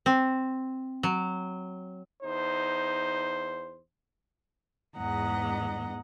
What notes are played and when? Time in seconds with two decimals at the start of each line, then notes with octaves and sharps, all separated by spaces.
0.06 C4
1.03 F#3
2.23 E2 D#4 C5
4.98 E2 G#2 B3 D#5 F#5 A#5